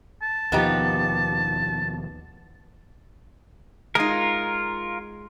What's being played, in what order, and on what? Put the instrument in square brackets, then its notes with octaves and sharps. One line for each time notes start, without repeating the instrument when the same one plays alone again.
[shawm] A5
[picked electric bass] D#2 B2 F3 [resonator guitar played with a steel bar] B3 D#4 G4
[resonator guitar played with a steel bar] G#3 D#4 [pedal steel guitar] F4 A#4